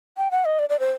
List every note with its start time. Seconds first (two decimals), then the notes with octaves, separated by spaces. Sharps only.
0.17 G5
0.31 F#5
0.45 D#5
0.59 D5
0.69 D5
0.80 C5